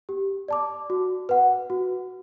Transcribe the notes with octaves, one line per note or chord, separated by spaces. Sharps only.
G4
D5 A5 D6
F#4
B4 F#5
F#4